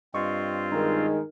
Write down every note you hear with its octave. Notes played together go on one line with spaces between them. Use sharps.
G2 C4 F4 D#5 C#6
D#3 G#3 D#4 A#4